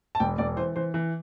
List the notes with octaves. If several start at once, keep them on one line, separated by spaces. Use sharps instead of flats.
A5
E1 G5
E1 D5
E3 C5
E3 C5
E3